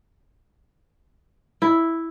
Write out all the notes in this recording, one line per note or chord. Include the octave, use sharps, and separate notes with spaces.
E4